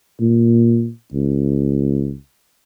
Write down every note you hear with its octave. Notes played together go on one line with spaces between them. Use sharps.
A#2
C#2